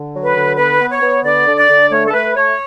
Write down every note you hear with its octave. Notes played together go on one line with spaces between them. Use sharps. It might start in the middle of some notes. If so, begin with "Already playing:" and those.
Already playing: D3
F#3
B4
D3
B3 B4
B3
C#5
B3
D3 D5
D3
D5
D3
A3 C#5
A4
A3 B4
A3 C#5